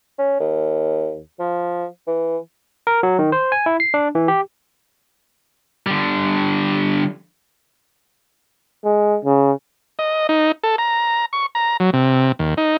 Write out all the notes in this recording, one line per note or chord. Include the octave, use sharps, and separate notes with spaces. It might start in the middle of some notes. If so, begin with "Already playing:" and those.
C#4
D#2
F3
E3
A#4
F#3
D#3
C5
G#5
E4
C7
D4
E3
G4
D3 G3
G#3
C#3
D#5
D#4
A4
A#5
C#6
A#5
F#3
C3
D#2
D#4